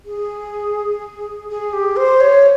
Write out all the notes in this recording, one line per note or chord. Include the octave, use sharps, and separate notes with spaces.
G#4
G#4
G4
C5
C#5